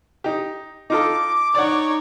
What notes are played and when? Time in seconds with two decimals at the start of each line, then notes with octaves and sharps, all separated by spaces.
0.24 D#4 G4
0.90 D#4 F4 A4 D6
1.55 D#4 C#5 D5 F#5